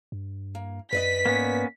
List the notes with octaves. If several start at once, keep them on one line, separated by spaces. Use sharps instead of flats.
G2
A#3
F#2 B4 D5 D#5 B6
G#2 A#3 B3 C#4